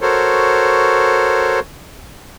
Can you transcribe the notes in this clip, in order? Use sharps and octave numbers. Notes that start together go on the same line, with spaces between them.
F#4 A4 A#4 C5 C#5